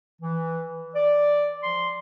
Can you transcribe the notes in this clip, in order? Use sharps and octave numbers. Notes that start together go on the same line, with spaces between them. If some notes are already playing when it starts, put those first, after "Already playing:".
E3
D5
F3 C6